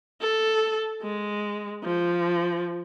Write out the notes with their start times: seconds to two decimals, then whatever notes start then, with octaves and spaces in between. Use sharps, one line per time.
0.21 A4
1.02 G#3
1.83 F3